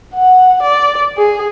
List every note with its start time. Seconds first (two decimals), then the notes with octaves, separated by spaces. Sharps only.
0.14 F#5
0.62 D5
1.17 G#4